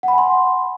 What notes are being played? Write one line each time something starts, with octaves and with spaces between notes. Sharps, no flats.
F#5 G#5 B5 C6